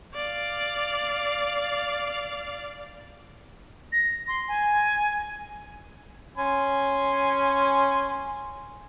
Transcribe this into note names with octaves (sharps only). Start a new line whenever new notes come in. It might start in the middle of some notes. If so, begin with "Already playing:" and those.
D5 F5
A#6
C6
G#5
C#4 G#5 C6